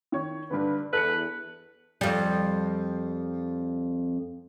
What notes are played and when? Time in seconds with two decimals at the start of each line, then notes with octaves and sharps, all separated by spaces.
0.12 D#3 C#5 C#6
0.51 G2 D3 B4
0.93 E2 A4 B4 C#7
2.01 F2 G3